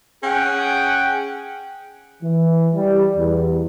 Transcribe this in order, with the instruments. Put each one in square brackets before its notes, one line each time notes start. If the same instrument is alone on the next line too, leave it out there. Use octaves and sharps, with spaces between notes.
[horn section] C#4 G#4 F#5 G5
[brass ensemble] E3
G3
E2